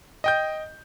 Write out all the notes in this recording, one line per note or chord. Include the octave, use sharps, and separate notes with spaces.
D#5 G5 G6